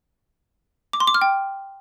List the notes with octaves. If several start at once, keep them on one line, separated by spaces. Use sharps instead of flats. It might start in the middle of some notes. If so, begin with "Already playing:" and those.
D6
C6
D6
F6
G5